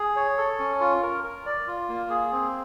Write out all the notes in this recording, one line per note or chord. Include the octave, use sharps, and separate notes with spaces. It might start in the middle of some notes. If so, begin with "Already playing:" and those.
Already playing: G#4
C#5
A4
C#4
F4
A#4
A#4
D5
F4
A#3
G#4
C4